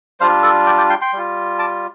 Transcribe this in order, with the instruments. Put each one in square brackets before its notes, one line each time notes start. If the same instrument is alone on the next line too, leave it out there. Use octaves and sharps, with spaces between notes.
[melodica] G3 D4 F4 C5 F5
A4 D5
D5 G5
D5 G5
G5 C6
G5 C6
G3 F4
A5 D6